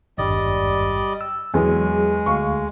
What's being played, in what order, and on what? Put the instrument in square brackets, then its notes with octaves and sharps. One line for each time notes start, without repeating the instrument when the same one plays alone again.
[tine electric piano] G#1 E2 G2 [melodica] G3 D5 D#5
[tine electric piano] E6
[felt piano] E2 [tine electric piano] F#3 G#4 [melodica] G#3
[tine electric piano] D2 F5 [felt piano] C#6